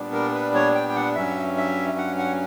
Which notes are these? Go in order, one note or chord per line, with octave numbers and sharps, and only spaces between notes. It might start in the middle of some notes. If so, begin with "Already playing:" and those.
Already playing: A#2 G3 B3 D4
A#4
B4
C#5
G5
G5
F#5
G2 F#3 C#4 E5
E5
F#5
F#5